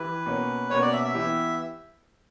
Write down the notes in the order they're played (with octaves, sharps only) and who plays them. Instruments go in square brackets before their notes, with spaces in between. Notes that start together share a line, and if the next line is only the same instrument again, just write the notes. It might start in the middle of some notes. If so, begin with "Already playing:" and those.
Already playing: [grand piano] E3 E4 G4 [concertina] B4
[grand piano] B2 A#3 C#4
[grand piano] B2 A#3 C#4 [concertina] C#5
[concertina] D5
E5
E5
[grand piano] E3 B3 E4 G4